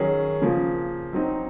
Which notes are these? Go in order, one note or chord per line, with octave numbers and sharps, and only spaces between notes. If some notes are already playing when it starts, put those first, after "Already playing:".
Already playing: D#3 F#3 C#4 G#4
C#3 F3 A#3
F#3 C4 D#4